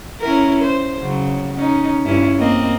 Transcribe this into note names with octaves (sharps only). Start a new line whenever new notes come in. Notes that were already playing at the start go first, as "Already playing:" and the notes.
C#4 E4 A#4
C5
C#3 F#3
C#4 D#4
G2 C#4 E4
A#3 C4 D#5